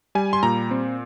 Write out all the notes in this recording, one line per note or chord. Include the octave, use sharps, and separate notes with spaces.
G3 G#5
C6
A#2 A#5
C4